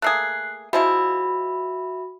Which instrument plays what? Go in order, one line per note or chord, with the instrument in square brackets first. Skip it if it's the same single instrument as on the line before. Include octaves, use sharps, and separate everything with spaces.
[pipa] A3 A#3 G#4 [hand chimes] F#6 C7
[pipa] F3 G#3 E4 [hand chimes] F#4 E5 B5